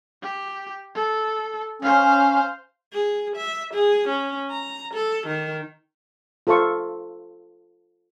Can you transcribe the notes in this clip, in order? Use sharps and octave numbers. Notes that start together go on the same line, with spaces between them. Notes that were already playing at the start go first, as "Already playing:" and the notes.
G4
A4
C#4 C5 F5
G#4
E5
G#4
C#4
A#5
A4
D#3
F4 A4 C5 E5 C#6